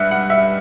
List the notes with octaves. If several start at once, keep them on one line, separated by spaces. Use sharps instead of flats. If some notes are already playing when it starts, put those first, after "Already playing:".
Already playing: G2 E5 F#5
F#5
E5